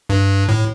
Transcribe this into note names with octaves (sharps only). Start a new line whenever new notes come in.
G2
A2